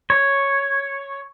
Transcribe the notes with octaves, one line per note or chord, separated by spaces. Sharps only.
C#5